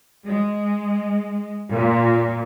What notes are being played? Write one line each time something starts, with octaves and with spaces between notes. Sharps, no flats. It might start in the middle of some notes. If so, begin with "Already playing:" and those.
G#3
A#2